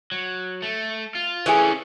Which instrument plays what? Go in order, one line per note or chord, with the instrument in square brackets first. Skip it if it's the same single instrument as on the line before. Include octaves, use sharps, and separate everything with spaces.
[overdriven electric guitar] F#3
A3
F4
[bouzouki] E3 A3 G#4 [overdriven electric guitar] C#4 D4